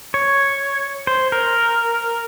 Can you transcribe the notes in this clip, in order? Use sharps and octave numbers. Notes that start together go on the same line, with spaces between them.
C#5
C5
A#4